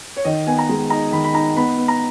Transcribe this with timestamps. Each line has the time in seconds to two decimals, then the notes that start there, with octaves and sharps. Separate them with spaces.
0.16 C#5
0.25 D#3 D#5
0.47 B3 G#5
0.58 A#5
0.69 G#3
0.90 D#4 A#5
1.12 D#3 B5
1.24 B5
1.34 D#4 A#5
1.56 B3 B5
1.77 B3
1.88 A#5